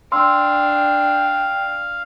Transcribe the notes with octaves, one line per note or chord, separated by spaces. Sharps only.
D4 F5 G5 C6 E6